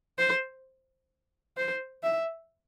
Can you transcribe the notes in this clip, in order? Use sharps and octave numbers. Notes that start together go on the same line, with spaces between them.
C5
C5
E5